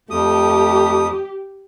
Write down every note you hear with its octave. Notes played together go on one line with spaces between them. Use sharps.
F2 A3 G4 D#6